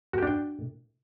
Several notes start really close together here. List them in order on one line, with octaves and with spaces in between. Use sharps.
F#4 G4 D4 G5